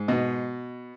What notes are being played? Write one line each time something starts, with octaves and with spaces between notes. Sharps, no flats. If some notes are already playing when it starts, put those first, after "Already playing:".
Already playing: G#2
B2 D#5